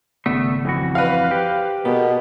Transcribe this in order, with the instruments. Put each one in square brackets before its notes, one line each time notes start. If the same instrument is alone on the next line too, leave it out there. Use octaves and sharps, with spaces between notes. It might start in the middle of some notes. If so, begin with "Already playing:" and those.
[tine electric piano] G#1 C#3 D5 [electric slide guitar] A3 B3 E5
[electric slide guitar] F2 E3 F#4
[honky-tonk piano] B4 F5 [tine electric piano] C5 D5
[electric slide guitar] G4
[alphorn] B2 [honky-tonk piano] B3 [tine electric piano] G#4 A#4